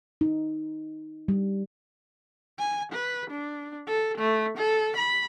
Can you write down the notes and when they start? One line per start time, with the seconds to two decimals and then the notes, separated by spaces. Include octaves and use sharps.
0.21 D#4
1.28 G3
2.59 G#5
2.92 B4
3.31 D4
3.88 A4
4.18 A3
4.58 A4
4.97 B5